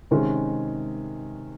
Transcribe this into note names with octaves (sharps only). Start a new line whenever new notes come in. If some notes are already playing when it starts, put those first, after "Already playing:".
C3 D#3 G#3 C#4